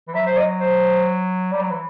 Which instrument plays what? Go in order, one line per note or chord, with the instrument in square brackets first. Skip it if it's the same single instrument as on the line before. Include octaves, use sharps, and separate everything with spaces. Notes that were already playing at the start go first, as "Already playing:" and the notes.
[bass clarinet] E3
[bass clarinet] F#3 [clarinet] E5
[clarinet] C5
D#5
C5
[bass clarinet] G3
F#3
E3